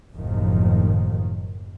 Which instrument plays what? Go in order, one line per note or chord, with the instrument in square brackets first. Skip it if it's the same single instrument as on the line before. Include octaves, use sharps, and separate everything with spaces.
[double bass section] F#1 D#2 A2 D#3 F3